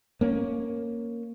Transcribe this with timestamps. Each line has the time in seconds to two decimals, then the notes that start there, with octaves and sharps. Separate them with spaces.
0.21 A#3 C#4